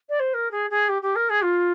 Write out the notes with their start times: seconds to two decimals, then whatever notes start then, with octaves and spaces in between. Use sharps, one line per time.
0.09 D5
0.20 C5
0.34 A#4
0.51 G#4
0.70 G#4
0.89 G4
1.02 G4
1.16 A#4
1.30 G#4
1.43 F4